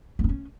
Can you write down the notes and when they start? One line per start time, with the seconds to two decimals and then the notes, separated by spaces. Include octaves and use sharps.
0.19 A#3
0.24 C4
0.29 C#4